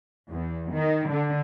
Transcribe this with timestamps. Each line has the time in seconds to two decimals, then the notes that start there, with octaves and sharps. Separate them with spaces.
0.28 E2
0.72 D#3
1.08 D3